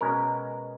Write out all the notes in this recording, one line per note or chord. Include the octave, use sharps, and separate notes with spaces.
B2 G#3 C#4 A#4